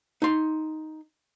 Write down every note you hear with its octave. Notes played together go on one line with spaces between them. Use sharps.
D#4 C6